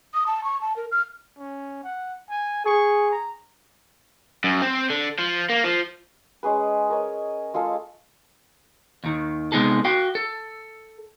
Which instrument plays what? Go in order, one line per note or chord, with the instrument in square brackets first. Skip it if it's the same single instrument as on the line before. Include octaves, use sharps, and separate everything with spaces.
[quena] D#6
A5
C#6
A5
A#4
F6
[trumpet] C#4
F#5
G#5
[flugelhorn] G#4 [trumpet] C#6
[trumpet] A#5
[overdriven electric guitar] F#2
C4
D3
F3
A#3
F3
[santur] G#3 C#4 G#4 B4
A#4 C#5 D#5
G#3 F4 G#4 A4
[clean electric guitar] D#2 D#3
C3 G#3 B3 D#4 G#4 A4
F#4 F5 G5
A4